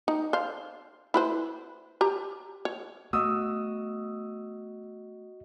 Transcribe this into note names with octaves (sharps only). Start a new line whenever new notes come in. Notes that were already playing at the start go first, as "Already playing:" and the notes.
D#4
C5 F5
E4 B4 C5
G4 A#5
C#5
A3 B3 F#4 D#5 D#6 E6